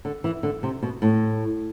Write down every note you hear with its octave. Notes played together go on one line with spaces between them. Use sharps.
D3
E3
D3
C3
B2
A2